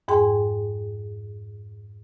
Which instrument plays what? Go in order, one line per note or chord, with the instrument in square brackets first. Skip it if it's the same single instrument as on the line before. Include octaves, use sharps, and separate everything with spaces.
[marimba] F2 G#2 G#4 G5 G#5 C6